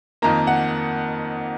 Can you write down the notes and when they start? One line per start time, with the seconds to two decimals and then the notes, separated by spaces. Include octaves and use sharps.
0.22 F2 D#3 A#3 A#5
0.47 F#5